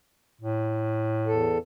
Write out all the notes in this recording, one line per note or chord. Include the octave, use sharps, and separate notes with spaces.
A2
E2 A4